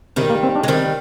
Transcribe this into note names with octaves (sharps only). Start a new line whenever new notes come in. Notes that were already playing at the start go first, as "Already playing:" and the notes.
C3 D#3 G3
A#3
C4
D4
G#3
D#3 G3 C4